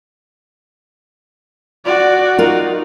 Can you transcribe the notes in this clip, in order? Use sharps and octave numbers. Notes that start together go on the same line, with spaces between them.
F#4 D5
D#4 F4 A#4